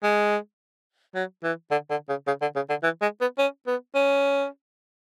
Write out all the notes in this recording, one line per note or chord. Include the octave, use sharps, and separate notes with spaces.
G#3
F#3
E3
D3
D3
C#3
C#3
D3
C#3
D3
E3
G#3
B3
C#4
B3
C#4